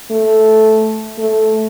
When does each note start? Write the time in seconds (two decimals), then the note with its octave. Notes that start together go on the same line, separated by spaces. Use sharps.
0.11 A3
1.18 A3